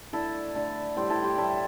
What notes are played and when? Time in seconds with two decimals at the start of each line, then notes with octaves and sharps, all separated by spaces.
0.13 D3 A3 E4 A4
0.55 D3 A3
0.96 A2 G3 G4 C5
1.10 E4 A4
1.23 G4 C5
1.37 A2 G3 E4 A4